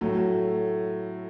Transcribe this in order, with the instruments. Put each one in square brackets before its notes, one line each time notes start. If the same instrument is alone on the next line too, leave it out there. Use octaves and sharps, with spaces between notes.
[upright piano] A2 F#3 A3